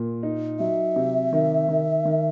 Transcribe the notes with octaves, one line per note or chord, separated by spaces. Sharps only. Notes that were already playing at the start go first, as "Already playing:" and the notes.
Already playing: A#2 A#3
D#4
F#3 E5
C3
D#3
D#3
D#3